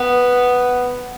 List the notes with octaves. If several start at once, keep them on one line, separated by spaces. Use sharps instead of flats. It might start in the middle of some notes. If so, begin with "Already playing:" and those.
Already playing: B3